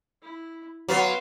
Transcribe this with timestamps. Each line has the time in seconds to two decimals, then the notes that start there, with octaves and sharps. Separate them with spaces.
0.22 E4
0.89 F#3 B3 F5 C6